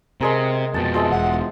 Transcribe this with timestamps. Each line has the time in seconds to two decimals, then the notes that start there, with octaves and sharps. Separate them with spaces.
0.21 C3 G#3 G#4 A#4
0.74 F2 B2 G5 A5
0.94 F3 G#3 E5
1.10 E1 F#5